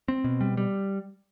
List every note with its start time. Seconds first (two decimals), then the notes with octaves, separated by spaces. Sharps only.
0.08 C4
0.24 B2
0.41 G3
0.57 G3